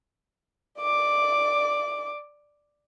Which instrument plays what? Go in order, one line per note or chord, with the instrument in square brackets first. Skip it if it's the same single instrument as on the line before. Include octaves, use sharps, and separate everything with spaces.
[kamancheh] D5 D6